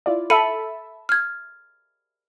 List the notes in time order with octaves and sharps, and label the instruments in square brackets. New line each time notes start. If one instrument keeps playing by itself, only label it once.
[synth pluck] E4 F4 D5
[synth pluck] A4 E5 A5 [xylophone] B5 C#7 D#7
[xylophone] F6 G#6